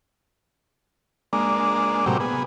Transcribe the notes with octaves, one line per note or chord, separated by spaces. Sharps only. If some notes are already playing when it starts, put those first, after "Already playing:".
G#3 A#3 D4
A2 C3 F#3 A#3 G4
B3 G#4